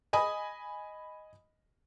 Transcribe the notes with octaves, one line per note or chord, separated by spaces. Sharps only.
D#5 G#5 B5 D#6